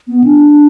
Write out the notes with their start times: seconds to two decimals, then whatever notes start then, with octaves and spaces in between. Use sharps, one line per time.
0.08 B3
0.24 D4